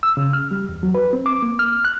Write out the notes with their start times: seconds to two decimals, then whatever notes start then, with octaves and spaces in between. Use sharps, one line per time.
0.03 E6
0.17 C#3
0.33 F6
0.51 G3
0.69 E2
0.83 F#3
0.95 B4
1.13 C4
1.26 D6
1.42 A#3
1.59 F6
1.85 F#6